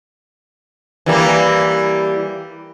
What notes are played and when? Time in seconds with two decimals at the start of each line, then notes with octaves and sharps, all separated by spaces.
1.06 E3 G3 A#3